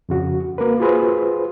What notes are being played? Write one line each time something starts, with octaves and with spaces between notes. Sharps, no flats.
F2 C#3 F#4
A#3 A#4 B4
F4 F#4 G#4 B4 C5